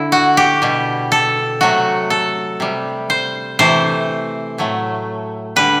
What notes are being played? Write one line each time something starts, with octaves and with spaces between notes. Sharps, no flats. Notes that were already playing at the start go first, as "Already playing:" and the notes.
Already playing: D3 E4
F#4
G4
B2 G3
A4
C3 F#3 A3 F#4
A4
C3 G3
C5
C3 E3 A3 C5
A2 F#3 A3
D3 G3 B4